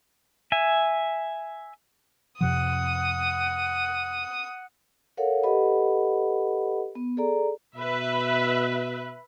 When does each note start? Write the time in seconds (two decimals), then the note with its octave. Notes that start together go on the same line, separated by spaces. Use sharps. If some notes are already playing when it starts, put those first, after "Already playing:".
0.52 E5 G#5
2.41 F2 C3 F3 F#5 D#6
5.17 A4 A#4 C#5 F5 F#5
5.43 G4 A4 B4 D#5 F#5 B5
6.95 B3
7.17 G#4 A4 D5 A#5
7.76 B2 B4 E5